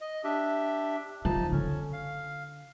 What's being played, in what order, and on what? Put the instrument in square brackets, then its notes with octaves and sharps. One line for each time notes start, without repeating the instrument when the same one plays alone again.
[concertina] D#5
D4 G4 E5
[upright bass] D#3 F3 [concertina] D#4 A5
[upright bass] D3 [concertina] C#4
[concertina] F5